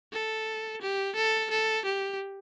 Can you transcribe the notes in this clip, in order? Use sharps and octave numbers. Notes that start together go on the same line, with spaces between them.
A4
G4
A4
A4
G4